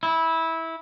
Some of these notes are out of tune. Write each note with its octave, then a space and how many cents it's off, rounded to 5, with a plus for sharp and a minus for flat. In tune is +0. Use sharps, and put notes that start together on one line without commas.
E4 -15